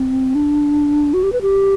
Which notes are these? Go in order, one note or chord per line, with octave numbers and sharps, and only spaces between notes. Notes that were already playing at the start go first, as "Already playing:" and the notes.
Already playing: C4
D4
F#4
G4
B4
G4